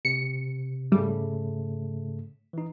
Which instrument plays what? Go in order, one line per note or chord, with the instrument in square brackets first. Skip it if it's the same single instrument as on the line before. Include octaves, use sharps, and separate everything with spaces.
[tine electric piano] C3 [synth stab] C#7
[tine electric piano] G#2 C#3 A3 [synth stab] G3
[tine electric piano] E3 D#4